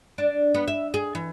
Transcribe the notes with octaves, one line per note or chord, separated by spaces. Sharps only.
D4
B3
E5
G#4
E3